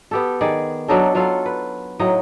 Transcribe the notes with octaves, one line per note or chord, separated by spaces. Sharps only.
B3 G4 A4
D#3 G#4 D5
F#3 D4 D#4 A4
F#3 F4 A4 F5
B4
A2 F#3 D#4 D#5